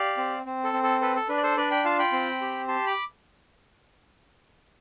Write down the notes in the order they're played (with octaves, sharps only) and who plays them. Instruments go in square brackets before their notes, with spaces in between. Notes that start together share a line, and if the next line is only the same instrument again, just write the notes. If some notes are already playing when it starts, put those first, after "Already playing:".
Already playing: [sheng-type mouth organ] G4 D5 F5
C4
C4
A4
C4
A4
A4 B4
A4
D4 B4
D5
A4 C5
D4 B4 D5
G5 B5
F4 F5 A5
G5 B5
C4
G4
G4 A5 C6
B5 D6